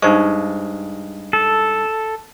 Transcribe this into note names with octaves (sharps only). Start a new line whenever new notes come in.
G2 G#3 D#4 C5 C#6
A4